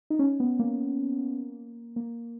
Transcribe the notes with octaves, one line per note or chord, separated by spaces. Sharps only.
D#4
C#4
B3
A#3
A#3